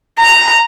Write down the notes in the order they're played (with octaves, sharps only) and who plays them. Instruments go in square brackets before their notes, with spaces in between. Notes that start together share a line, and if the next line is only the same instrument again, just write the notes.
[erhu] A#5